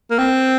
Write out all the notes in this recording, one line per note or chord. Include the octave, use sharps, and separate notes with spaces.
A#3
C4